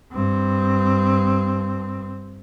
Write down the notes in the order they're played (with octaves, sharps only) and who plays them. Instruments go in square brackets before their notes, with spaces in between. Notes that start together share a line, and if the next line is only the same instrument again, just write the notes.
[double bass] G2 C4